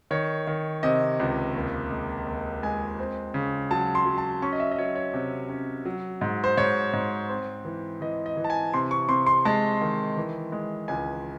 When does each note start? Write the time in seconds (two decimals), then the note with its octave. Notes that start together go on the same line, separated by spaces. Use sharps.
0.11 D#3 C#5
0.47 D#3
0.83 C3 D#5
1.20 C#2
1.55 D#2
1.90 G#3
2.27 D#2
2.63 G#3 G#5
2.99 C4
3.34 C#3
3.71 F#3 A5
3.95 C6
4.06 F#3
4.18 A5
4.42 C#4 C#6
4.52 D#5
4.60 E5
4.71 D#5
4.78 F#3 C#5
4.95 C#5
5.14 C3
5.49 C#4
5.85 F#3
6.21 G#2
6.44 C5
6.57 G#2 C#5
6.93 G#2
7.29 C4
7.65 E3
8.01 E3 D#5
8.26 D#5
8.37 E3
8.44 A5
8.50 G#5
8.74 C3 C6
8.91 C#6
9.09 C3 C6
9.26 C6
9.45 G#3 A5
9.81 D#3
10.17 E3
10.52 G#3
10.88 C#2 G#5